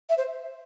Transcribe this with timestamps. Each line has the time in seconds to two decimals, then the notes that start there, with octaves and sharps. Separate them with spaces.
0.09 E5
0.17 C5